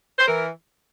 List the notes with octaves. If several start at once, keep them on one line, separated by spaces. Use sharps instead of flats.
C5
E3 A#4